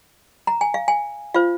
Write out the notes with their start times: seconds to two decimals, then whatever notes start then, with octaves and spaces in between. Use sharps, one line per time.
0.47 A#5
0.61 G#5
0.74 F5
0.88 G#5
1.34 F4 C5 F5